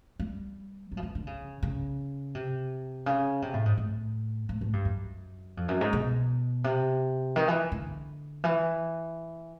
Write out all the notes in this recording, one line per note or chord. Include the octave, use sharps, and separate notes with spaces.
G3
F#3
F3
E3
D3
C#3
C#3
C3
C#3
C3
A2
G#2
A2
A2
A2
G2
F#2
F2
F#2
G#2
B2
C3
D#3
E3
D3
E3